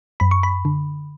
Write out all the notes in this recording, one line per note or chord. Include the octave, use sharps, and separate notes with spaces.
F#2 B5
C#6
B5
D3